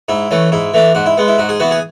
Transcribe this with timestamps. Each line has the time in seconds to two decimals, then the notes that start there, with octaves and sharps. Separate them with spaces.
0.08 G#2 E4
0.31 E3 A3 C#4
0.52 G#2 E4
0.74 E3 A3 D4
0.95 G#2 F#4
1.06 E4
1.17 G#3 B3
1.28 E4
1.38 G#2 F#4
1.49 G#4
1.60 E3 B3 F#4
1.71 G#4